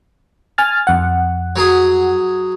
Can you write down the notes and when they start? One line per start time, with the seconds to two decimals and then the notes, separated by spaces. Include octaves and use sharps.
0.58 G#5 F6 A6
0.87 F2 F#5
1.56 F#3 G#4